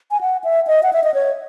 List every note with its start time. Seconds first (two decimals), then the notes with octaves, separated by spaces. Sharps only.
0.11 G#5
0.21 F#5
0.44 E5
0.67 D#5
0.83 F#5
0.93 E5
1.04 D#5
1.14 C#5